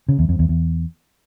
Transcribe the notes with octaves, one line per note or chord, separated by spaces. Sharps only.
C#3
E2
F2
E2
E2